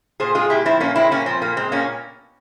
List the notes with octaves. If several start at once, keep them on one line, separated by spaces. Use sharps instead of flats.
A#2 G#4 C5
G#3 F4 G#4
A#2 E4 G4
F3 C4 E4
A#2 A#3 C#4
G#3 C4 E4
A#2 A#3 C#4
F3 C4
A#2 A#3
G#3 C4
A#2 A#3 C#4